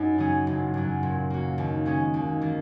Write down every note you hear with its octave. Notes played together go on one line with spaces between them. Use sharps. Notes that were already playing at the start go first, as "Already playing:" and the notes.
Already playing: F#2 D#4
C#3 F#3 C#4 G#4
F#1
F#2 F#3
A#2
A#3 F#4
D#2
C#3 G#3 C#4
D#2
D#3 A#3